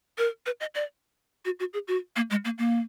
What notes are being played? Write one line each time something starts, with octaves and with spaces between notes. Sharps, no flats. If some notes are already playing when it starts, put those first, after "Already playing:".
A#4
B4
D#5
D5
F#4
F#4
G#4
F#4
A#3
G#3
A#3
A#3